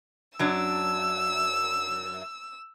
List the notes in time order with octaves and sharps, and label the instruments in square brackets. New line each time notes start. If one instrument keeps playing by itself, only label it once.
[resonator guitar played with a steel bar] F#2 F#3 D4 [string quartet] E6